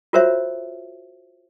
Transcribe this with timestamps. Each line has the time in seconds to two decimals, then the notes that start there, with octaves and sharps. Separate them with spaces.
0.13 F4 F#4 A#4 C5 C#5 E5